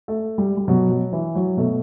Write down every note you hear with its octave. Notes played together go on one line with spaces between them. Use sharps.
A3
G3
G3
B2 F#3
F#3
E3
F#3
B2 A3